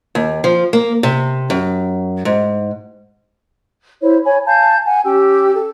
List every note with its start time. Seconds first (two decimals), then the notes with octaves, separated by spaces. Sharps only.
0.15 D#2
0.44 F3
0.73 A#3
1.03 C3
1.50 F#2
2.25 G#2
4.01 E4 C5 C#5
4.24 C#5 G#5 B5
4.46 F5 G#5 A5 G6
4.85 F#5 G#5
5.04 C#4 G4 G5 E6
5.56 A4